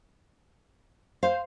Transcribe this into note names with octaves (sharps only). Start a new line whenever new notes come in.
C5 F5